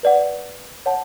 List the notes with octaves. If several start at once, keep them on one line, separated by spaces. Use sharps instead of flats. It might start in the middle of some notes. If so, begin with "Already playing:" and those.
B4 D5 F#5
C#5 F#5 A5